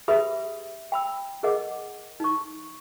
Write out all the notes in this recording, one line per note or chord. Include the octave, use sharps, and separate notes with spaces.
G4 G#4 B4 E5 B5 D#6
G5 B5 E6
C#4 G#4 A#4 D#5 F#5 D6
D#4 C#6